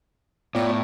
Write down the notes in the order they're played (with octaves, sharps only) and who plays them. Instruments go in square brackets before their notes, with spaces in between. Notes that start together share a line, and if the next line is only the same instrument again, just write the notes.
[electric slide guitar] A2 [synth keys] B3 G5 A#5 [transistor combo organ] F4 C#5 D5